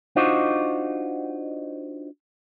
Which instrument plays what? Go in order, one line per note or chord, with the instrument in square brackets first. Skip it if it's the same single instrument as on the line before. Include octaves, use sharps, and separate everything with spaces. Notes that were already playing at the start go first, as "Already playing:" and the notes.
[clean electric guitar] D4 D#4 F4 F#4 C5 D#5